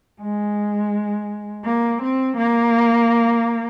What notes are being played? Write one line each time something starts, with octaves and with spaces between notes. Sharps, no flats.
G#3
A#3
C4
A#3